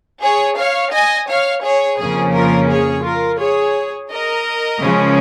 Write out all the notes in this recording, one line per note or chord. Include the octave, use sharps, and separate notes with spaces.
G#4 C#5
C#5 F5
D#5 G#5
C#5 F5
G#4 C#5
F2 C#3 F3 A#3 C#4 G#4
F4 A#4
G#4 C#5
F4 A#4
G#4 C#5
A#4 D#5
C#3 F3 G#3 C#4